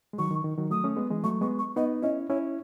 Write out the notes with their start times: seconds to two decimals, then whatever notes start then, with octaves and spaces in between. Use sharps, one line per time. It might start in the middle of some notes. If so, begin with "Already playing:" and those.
0.13 G#3
0.18 D#3 F#3 C#6
0.31 D#3
0.44 D#3
0.57 D#3 F#3
0.70 F#3 A3 D#6
0.84 A3 C#4
0.97 G#3 B3
1.11 E3 G#3
1.24 F#3 A3 C#6
1.41 G#3 B3 C#6
1.59 C#6
1.76 B3 D#4 D#5
2.02 C#4 E4 D#5
2.30 C#4 E4 C#5